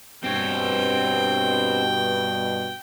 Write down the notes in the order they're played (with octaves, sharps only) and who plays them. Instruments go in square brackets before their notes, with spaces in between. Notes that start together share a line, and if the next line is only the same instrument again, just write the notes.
[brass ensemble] G2 B2 [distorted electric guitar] C4 C#5 [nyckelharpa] G5